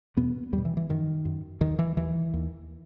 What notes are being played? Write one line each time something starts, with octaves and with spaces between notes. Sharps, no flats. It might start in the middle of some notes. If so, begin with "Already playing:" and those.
E2 B2 B3
E2 G3
B2
E3
E3
F#2 D#3
F#2
D#2 D#3
E3
D#2 E3
D#2